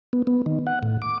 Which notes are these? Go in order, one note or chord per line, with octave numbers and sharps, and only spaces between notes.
B3
B3
D#3
F#5
A2
D6